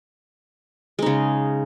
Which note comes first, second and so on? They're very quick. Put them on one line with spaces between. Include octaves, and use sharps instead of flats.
G#3 D#4 C#3